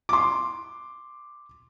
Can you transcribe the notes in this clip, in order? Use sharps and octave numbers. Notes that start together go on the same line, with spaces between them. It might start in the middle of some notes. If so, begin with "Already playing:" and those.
C6 D6